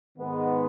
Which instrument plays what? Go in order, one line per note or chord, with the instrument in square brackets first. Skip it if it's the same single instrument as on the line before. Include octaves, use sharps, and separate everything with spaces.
[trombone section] G#2 D#3 G#3 B3 D#4